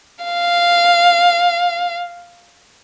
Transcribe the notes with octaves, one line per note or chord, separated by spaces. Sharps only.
F5